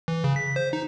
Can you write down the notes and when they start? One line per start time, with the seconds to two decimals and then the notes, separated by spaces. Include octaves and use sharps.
0.08 E3
0.24 C#3
0.36 B6
0.56 C5
0.73 D#4